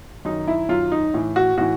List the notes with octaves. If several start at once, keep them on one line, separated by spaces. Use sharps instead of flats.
F#2 D#3 D#4
E4
F#2 F4
D#3
D#4
A2 E3
F#4
A2 E3 F#4